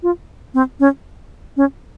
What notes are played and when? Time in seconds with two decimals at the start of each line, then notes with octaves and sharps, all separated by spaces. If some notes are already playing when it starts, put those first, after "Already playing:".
0.03 F4
0.54 C4
0.80 C#4
1.57 C#4